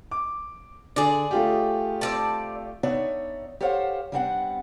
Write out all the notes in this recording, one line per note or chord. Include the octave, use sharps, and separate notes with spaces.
D6
D3 G#4 D5
A3 F4 G4
C4 D5 A5
B3 D4 D#4 C#5 D5 E5
G4 A4 C5 C#5 F5 F#5
G3 B3 C4 D4 F5 F#5